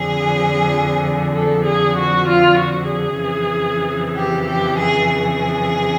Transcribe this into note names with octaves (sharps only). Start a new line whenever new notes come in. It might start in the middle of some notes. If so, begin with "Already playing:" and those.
Already playing: F2 D3 F3 G#4
A4
G#4
F#4
F4
F#4
G#4
F2 C#3 E3
G4
G4
G#4
G#4